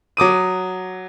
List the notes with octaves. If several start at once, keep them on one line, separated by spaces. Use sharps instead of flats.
F#3 D6 D#6 D#7